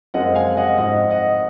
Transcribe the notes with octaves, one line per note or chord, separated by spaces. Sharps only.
F#2 F3 G#3 C4 D#5 F#5
F5 G#5
D#5 F#5
G#2 F3 C4 D#5 F#5
D#5 F#5